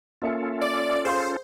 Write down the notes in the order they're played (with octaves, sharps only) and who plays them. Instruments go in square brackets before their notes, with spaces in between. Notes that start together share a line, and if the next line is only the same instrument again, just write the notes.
[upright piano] A#3 E5 C#7 [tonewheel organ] C#4 F4 A4
[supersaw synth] D5
[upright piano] G#4 F5 C6 [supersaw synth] C5